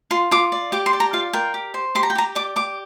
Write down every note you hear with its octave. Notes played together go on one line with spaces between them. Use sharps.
F4 C6
F4 D6
D5
G4 D6
C6
D5
A#5
F4 F5
A#4 G5
G4
C5
G4 C6
A#5
G5
G4 A#5
D5 D6
G4 D6